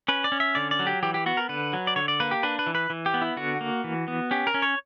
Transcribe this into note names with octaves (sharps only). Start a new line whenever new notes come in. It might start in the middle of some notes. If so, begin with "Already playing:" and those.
C#4 B4
D5
C#4
E5
D3 D5
D5
F#3
G4
E3 G4
G4
B3 F#4
A#4
D3 B4
F#3
D5
D3 C#5
D5
A#3 B4
G4
D4 B4
B4
E3
B4
E3
G4
B3
E4
D3 F#4
A#3
E3
B3
C#4 G4
A#4
C#4
C#5